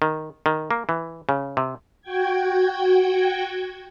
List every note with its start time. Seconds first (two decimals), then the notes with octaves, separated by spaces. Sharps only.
0.02 D#3
0.46 D#3
0.71 A#3
0.89 E3
1.29 C#3
1.57 C3
2.02 F#4 G5 G#6